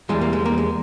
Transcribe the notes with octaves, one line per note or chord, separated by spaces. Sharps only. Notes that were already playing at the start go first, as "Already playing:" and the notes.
E2 E3 G3 G#3
A#3
G#3
A#3
G#3